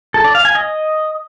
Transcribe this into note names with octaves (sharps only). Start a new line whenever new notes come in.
A4
D5
F5
G#5
D#5